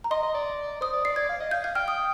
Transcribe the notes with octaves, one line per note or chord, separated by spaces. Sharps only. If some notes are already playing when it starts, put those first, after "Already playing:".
A#5
D#5 C6
D#5
D5
C5 D#6
D5
D5 C7
D5 G#6
F5
D#5
F5 G6
F5 G6
G5 F6
D#6